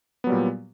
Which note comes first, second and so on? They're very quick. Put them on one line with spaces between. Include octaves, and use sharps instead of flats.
B3 F#3 G3 A#2